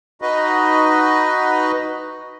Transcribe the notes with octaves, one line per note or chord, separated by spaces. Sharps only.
D#4 F#4 B4 D#5